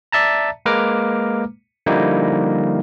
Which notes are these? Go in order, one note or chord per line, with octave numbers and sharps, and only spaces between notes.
D5 E5 A5 A#5
G#3 A#3 B4 A#5 D6 F6
D3 F3 G3 A#3 D#4 E4